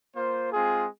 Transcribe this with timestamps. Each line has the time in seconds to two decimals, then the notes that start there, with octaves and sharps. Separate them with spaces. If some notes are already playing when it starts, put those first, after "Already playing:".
0.15 A#3 F4 C5
0.51 G#3 C4 F4 G#4